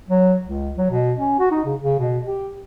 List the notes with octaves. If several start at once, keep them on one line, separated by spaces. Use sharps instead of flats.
F#3
C#2
F#3
B2
C#4
F#4
D#4
C#3
C#3
B2
G4